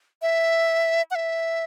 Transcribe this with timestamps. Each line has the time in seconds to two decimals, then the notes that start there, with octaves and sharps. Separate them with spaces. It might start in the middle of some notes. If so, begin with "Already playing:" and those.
0.22 E5
1.11 F#5
1.15 E5